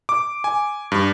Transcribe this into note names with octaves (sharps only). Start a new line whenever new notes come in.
D6
G#5
G2